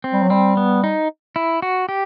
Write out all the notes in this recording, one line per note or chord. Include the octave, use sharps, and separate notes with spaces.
C4
G3
F#3
G3 C4
B3
D#4
E4
F#4
G4